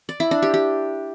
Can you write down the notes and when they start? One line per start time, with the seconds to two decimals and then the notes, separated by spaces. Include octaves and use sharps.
0.09 D5
0.20 E4
0.31 D4
0.42 G4
0.54 G4